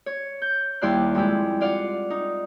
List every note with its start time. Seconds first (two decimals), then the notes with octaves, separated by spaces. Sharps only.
0.06 C#5
0.42 G6
0.82 D#2 G3 E4 D5 C6 F#6
1.15 F2 G#3 E4 G4
1.61 F4 D5 F5 F#5
2.10 D#4